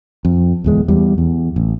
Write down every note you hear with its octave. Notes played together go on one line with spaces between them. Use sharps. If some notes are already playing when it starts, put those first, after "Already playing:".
F2
D1 E2 G#3
E2 G3
E2
A1